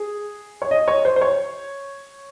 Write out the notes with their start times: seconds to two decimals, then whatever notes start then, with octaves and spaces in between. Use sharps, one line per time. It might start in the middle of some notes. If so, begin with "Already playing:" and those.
Already playing: G#4
0.62 C#5
0.71 D#5
0.88 C#5
1.05 C5
1.16 C5
1.21 C#5